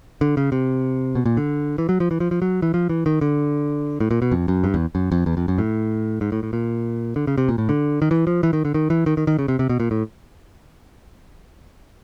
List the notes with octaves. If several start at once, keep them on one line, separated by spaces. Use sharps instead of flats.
D3
C#3
C3
B2
A#2
D3
E3
F#3
F3
E3
F3
F3
F#3
E3
F3
E3
D#3
D3
A2
A#2
B2
F2
F#2
G2
E2
F#2
F2
E2
F2
F#2
A2
G#2
A2
A2
A#2
D3
C#3
C3
A#2
A2
D3
D#3
E3
F3
E3
D#3
D3
D#3
E3
D#3
D#3
D#3
C#3
C3
C3
B2
A#2
A2